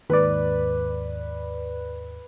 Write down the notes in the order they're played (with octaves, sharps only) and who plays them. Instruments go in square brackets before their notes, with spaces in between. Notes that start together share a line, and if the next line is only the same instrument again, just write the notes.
[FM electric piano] D#2 G#2 D5 [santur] B4